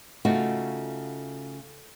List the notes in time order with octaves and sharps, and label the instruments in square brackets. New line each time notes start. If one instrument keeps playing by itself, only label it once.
[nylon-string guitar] C#3 A3 D#4 F4 F#4